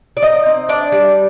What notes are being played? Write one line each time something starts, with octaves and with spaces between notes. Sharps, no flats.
D5
D#4 D#5
C4
D4 D5
G3